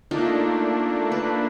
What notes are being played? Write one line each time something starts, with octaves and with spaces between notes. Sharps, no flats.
A3 A#3 D4 D#4 F4
B4